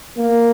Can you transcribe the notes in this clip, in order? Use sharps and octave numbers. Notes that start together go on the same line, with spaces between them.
A#3